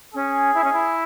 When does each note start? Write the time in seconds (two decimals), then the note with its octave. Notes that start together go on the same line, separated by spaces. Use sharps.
0.14 C#4 G#4
0.54 E4
0.64 C#4
0.73 E4